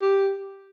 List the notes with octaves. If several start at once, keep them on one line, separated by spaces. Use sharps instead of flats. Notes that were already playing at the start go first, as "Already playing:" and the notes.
G4